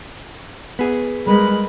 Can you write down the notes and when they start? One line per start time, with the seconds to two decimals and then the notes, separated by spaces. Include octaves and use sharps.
0.79 B3 G#4
1.27 G3 G#3 A#4 B4 B5